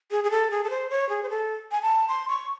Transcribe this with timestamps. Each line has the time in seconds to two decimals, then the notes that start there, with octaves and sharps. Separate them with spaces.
0.11 G#4
0.24 G#4
0.31 A4
0.51 G#4
0.64 A4
0.70 C5
0.90 C#5
1.09 G#4
1.23 C5
1.30 A4
1.72 G#5
1.82 A5
2.09 C6
2.29 C#6